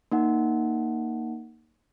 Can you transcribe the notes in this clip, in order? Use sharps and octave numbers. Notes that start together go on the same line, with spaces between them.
A#3 D#4 F#5